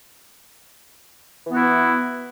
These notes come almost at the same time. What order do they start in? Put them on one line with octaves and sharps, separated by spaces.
E3 B3 F#4 E4